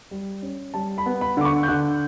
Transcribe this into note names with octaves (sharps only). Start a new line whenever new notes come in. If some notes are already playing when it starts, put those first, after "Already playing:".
G3
C#4
G3 A5
B5
B3
B5
D3 D6
C#6
G6
D3 F#6